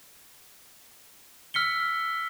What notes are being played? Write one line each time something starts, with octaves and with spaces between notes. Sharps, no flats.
E6 F6 B6 C#7 G7